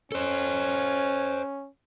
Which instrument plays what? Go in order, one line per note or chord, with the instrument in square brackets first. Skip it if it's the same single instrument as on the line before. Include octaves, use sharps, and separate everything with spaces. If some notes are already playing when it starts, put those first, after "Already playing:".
[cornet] C#4 [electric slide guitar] A4 C5